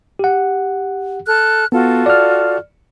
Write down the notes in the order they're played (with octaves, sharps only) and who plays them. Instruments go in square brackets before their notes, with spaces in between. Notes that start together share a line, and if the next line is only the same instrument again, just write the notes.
[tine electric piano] G4 F#5
[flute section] A4 F6 F#6
[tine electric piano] B3 [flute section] F4 F#4 A4
[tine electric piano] D5 F6